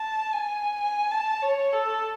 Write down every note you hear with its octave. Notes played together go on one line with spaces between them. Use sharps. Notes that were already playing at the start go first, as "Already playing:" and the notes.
Already playing: A5
G#5
G#5
A5
C#5
A4